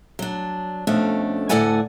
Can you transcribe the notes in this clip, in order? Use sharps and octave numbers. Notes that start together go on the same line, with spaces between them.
F#3 D4
F2 B2 A3 C#4 D4
D2 A2 A4 D5 F#5 G#5